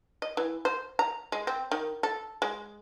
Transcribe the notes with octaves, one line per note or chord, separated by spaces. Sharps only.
D#5
E3
C5
A#5
G#3
C4
D#3
A4
G#3